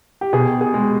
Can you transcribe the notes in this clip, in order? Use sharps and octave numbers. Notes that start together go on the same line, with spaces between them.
G4
B2 G#4
G#4
G#3